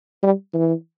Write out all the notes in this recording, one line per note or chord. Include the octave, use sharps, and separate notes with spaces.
G3
E3